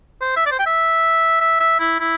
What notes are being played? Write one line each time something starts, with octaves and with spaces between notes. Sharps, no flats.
C5
E5
D5
C5
G5
E5
E5
E5
E4
E4